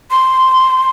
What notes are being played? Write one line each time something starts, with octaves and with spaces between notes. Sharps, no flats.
C6